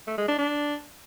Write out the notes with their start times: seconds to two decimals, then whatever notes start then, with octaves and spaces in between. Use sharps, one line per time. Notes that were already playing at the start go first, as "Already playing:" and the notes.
0.07 A3
0.18 G#3
0.28 D4
0.38 D4